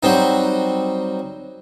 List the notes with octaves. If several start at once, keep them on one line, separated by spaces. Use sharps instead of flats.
F#3 G3 C4 D#4